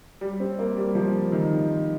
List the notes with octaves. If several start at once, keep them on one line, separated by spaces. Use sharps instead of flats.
G3
C4
A#3
G3
F3
D#3